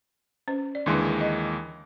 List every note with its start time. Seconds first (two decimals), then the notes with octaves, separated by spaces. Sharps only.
0.48 C#4 C5
0.75 D5
0.86 D#2 D3 E3 G#3 D4 C6
1.21 D#5